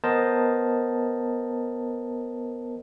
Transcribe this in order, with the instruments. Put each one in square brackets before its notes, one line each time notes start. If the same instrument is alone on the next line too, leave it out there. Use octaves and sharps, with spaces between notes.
[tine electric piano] B3 A#4 C5 D#5 A5